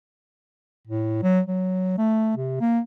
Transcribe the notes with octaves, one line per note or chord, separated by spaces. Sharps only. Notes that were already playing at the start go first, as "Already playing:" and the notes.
A2
F#3
F#3
A3
C3
A#3